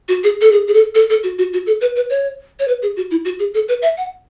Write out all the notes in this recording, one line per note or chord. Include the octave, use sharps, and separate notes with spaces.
F#4
G#4
A4
G#4
G#4
A4
A4
A4
F#4
F#4
F#4
A4
B4
B4
C#5
C#5
B4
G#4
F#4
E4
F#4
G#4
A4
B4
E5
F#5